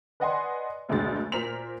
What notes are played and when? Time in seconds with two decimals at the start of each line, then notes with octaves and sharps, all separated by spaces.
0.20 B4 D5 D#5 F#5 G#5 C6
0.89 F#1 D2 B2 D3 G#3 A6
1.32 A#2 A#4 C5 B6 F7